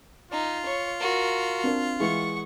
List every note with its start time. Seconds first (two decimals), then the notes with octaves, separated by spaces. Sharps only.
0.31 D#4 F4
0.65 C#5
1.00 F#4 A#4
1.64 C4 D4 A#4
2.00 E3 G#3 F#5 C#6